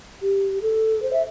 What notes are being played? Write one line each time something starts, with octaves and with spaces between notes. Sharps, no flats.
G4
A4
C5
E5